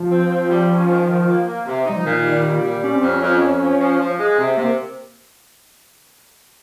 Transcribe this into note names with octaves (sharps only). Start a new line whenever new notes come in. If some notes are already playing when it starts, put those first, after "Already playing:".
Already playing: F3
C4
C4
G3
C#4
D#3
D#3
A#3
A#3
C3
G3 D#4
F3
A#2 D#3
G3
A#2
G3
G3 C#4
C4
F2 C#4
F2
F2
F3
F3
F3
G#3
C3 C4
C3 A#3